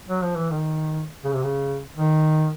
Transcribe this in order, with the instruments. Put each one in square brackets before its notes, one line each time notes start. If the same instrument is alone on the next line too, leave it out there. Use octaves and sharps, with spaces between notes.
[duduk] F#3
F3
E3
D#3
C#3
C3
C#3
D#3